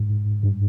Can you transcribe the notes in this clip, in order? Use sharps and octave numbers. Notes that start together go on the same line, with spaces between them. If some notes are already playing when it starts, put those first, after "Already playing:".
Already playing: G#2
G2